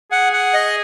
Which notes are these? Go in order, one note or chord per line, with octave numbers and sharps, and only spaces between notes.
G#4 F#5
F#5
D#5